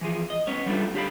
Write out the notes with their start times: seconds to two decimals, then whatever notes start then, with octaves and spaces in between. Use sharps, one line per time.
0.01 E3 F3 G#4
0.30 D#5
0.47 B3 C#4 C#5
0.66 F#3 G3 A3 D4 F4 A4
0.94 D3 G4 C5 F5 B5